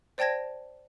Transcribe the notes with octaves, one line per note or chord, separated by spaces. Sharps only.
C5 D5 G5 A5 G#6 A#6